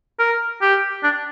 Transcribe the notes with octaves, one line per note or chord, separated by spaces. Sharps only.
A#4
G4
D4